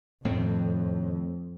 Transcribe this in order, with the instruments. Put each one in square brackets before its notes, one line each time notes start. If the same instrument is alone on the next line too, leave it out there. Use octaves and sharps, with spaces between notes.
[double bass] F2 [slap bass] A2 D#3 C4